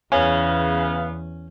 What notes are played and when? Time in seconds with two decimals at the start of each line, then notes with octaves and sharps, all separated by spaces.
0.12 E2 C#3 B3 C#4 F5